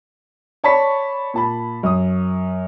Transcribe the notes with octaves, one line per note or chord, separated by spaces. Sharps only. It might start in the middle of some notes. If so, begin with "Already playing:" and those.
C#5 D5 A5 B5 C#6 B6
A#2 A5 B5
F#2 D#6